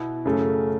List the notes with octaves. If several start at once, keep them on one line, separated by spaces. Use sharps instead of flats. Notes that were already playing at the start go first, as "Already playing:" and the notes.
Already playing: B2 B3 E4
F#2 C#3 A3